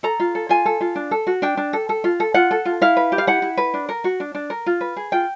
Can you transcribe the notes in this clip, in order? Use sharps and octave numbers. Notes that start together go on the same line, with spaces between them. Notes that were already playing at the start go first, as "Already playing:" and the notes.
A4 A#5
F4
A4
F4 G#5
A4
F4
D4
A4
F#4
D4 G5
D4
A4
A4
F4
A4
F4 F#5
A4
F4
E4 F5
B4
G4
F5
E4 F#5
E4
B4
D4
A#4
F#4
D4
D4
A#4
F4
B4
G#4
F4 G5